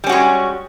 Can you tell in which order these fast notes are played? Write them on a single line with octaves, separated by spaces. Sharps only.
G3 C#4 F#4 G#3